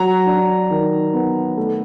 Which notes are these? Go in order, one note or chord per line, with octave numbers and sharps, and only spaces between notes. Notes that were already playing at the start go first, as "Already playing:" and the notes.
Already playing: F#3 A#5
D4
D#3
B3
A3